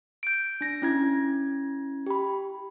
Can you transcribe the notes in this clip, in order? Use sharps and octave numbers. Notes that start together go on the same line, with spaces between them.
G6 D7
D4 A#6
C#4 E4 G#6
G4 B5